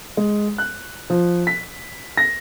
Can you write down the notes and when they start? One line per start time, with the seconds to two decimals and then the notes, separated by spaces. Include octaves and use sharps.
0.17 G#3
0.58 F#6
1.10 F3
1.47 B6
2.17 A#6